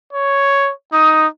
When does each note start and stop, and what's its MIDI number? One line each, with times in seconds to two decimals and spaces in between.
0.12 0.72 73
0.93 1.27 63
0.93 1.27 87